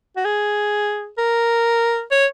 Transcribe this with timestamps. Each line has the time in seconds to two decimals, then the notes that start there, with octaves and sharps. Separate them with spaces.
0.17 F#4
0.25 G#4
1.18 A#4
2.11 C#5